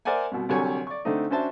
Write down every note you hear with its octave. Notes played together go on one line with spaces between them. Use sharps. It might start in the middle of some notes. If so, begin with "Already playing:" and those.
A#4 C5 D5 E5 F#5 G#5
C2 B2
C2 D3 F#3 G3 C#5 G#5
D5 C#6
D3 A3 C4 D4 D#4
C#4 D4 F#4 C5 E5 A5